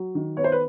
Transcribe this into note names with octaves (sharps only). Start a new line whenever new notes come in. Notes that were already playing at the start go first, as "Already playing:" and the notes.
Already playing: F#3
D#3
B3 C#5
C5
B4